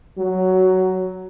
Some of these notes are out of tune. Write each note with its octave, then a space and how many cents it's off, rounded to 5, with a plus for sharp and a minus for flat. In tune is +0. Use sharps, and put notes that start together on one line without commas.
F#3 +10